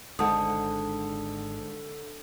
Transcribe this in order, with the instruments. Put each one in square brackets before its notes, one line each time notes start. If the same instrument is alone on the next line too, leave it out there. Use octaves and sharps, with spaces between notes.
[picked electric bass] G#1 G#2 [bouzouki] D3 [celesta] F#5 A5 D#6